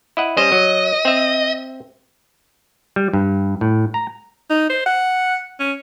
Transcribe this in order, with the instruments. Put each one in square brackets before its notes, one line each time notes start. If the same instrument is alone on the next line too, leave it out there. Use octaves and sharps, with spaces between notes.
[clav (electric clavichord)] E4 D#5 F#5
[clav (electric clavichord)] G3 C#4 C5 [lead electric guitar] D#5
[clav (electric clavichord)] F#3
C4 E5
G3
G2
A2
A#5
[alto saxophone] D#4
C5
F#5
C#4